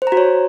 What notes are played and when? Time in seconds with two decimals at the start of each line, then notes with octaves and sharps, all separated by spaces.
0.02 C5
0.07 A#5
0.12 F#4
0.17 C#5